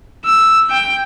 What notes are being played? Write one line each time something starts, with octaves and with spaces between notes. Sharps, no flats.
E6
G5